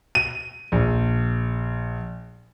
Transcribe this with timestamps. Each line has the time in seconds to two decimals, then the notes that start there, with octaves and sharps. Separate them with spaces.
0.15 D#7
0.72 A#1